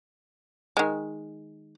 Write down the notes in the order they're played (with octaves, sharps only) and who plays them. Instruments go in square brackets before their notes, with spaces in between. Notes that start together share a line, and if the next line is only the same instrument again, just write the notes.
[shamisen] D#3 G#3